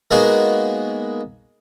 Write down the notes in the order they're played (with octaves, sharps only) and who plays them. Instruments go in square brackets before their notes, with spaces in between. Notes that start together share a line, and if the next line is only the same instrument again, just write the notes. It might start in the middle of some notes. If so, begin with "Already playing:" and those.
[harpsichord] G#3 A#3 B3 D#4 F#4 G#4